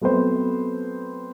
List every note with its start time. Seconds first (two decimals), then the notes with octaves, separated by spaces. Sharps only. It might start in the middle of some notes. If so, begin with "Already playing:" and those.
0.01 F#3 A3 B3 C4 C5